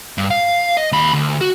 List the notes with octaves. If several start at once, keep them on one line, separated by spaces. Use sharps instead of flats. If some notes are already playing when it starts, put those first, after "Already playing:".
G2
F5
D#5
D#2 B5
D2
F#4